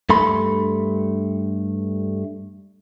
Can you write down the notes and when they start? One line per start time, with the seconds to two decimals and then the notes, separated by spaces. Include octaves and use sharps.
0.10 G2 A3 B5 C6